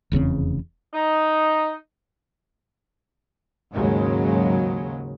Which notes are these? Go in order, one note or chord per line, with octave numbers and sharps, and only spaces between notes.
F1 E2 C#3 C4
D#4
D#2 G#2 C#3 F#3 G#3